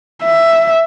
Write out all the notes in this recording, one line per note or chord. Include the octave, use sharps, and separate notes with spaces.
E5